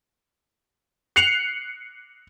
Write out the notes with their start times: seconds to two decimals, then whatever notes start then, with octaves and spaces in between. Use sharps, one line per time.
1.16 F#6 C7 C#7 F7 F#7